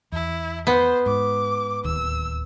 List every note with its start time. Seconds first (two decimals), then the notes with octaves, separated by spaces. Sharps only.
0.12 E2 E4
0.67 B3 C5
1.06 G#2 D6
1.84 D1 D#2 E6